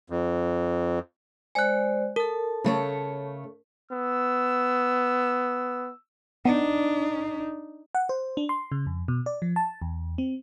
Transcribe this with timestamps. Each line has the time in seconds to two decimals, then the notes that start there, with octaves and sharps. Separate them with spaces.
0.10 F2
1.55 G#3 C5 D5 G#5 F#6
2.16 A4 A#4 A5
2.64 C#3 A3 C#5
3.91 B3 E6
6.45 B3 D4 D#4
7.95 F#5
8.09 C5
8.37 D4
8.49 C6
8.72 C#3
8.86 F2
9.08 B2
9.26 D5
9.42 F3
9.56 A5
9.82 E2
10.18 C4